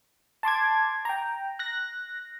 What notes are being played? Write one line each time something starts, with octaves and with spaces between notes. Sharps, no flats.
A5 C6 D6 G#6
G5 A#5
F#6 A#6